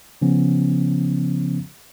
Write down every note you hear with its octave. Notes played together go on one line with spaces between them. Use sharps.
C#3 F3 B3 C#4